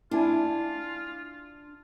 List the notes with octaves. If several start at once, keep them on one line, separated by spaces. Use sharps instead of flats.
D4 E4 F4 G#5